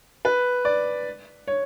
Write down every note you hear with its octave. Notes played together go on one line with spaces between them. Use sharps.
B4
D5
C#5